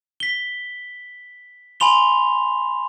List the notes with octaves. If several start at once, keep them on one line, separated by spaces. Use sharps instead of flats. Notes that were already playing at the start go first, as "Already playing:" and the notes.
B6 G7
G#5 B5 C6 F7 G7